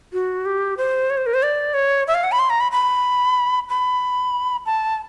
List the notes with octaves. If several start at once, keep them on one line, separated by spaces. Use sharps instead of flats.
F#4
G4
C5
C#5
C5
A#4
C5
D5
C#5
E5
F5
F#5
B5
C6
A#5
B5
B5
B5
A5